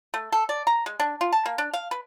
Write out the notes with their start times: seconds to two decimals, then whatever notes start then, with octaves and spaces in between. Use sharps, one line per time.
0.14 A3
0.32 A4
0.49 D5
0.67 A#5
0.86 G#3
1.00 D4
1.21 F4
1.32 A5
1.46 A#3
1.58 D4
1.74 F5
1.91 B4